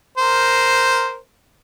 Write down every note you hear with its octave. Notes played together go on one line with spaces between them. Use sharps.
A#4 C5